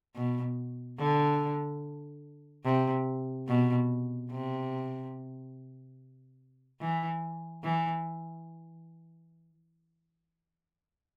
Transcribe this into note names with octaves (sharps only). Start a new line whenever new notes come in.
B2
D3
C3
B2
C3
E3
E3